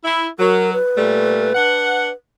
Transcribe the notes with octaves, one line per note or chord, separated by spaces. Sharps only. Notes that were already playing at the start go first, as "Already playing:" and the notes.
E4
F#3 A#4
B4
A#2 G3 A3
D4 F#5